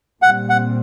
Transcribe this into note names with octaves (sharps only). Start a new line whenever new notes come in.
A#2 G3 C4 F#5
F#5